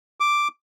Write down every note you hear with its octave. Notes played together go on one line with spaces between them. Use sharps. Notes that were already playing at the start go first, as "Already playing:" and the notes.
D6